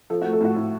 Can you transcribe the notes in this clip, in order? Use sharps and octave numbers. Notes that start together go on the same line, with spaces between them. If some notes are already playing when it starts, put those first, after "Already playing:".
F3 A4
F#4
A3
A4
A2 F#4
A2